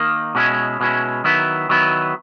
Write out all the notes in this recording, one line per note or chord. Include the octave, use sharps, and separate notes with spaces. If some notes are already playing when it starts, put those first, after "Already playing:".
Already playing: D#3 A#3 D#4
B2 G#3 C#4 E4
B2 G#3 C#4 E4
D#3 F#3 B3 E4
D#3 F#3 B3 E4